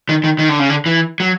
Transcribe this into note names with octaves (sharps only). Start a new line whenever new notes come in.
D#3
D#3
D#3
D3
C#3
D3
E3
F#3